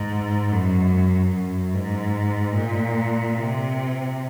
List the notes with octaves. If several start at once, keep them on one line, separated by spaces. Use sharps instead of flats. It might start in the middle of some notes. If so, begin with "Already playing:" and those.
Already playing: G#2
F#2
F#2
G#2
A#2
C3